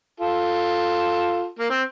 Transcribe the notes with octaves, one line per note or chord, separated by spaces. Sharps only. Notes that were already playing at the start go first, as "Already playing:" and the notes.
F4 A4
A#3
C4